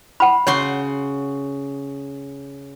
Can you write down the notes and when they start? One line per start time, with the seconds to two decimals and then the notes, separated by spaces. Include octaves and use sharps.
0.20 F#5 B5
0.47 C#3 F#4 C#5 C6